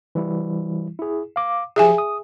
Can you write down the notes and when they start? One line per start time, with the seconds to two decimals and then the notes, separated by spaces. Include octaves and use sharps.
0.15 E3 G3 E4
0.99 E4 G#4
1.36 F5 D6
1.76 F3 G4 G#4 E5 G#5 D#6
1.98 D#6